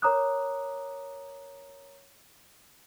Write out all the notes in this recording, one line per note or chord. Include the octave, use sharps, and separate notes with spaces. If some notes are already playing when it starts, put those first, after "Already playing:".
A#4 C#5 A#5 D6 D#6 F#6